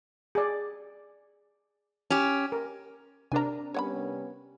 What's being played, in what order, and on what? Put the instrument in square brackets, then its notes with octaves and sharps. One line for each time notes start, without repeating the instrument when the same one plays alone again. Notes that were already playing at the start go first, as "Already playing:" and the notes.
[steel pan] G#4 D5
[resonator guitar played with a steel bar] C#4 G4
[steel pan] A#4
[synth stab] C3 D4 A#4 [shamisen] G#5 A#5
[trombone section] G3 B3 C#4 [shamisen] C#5 F#5 B5